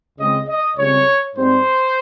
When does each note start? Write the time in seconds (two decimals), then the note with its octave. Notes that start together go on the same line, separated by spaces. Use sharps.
0.17 C#2 C#3 G#3 C4 D#5
0.47 D#5
0.76 C#2 C#3 G3 C4 C#5
1.35 G#2 G3 C4 C5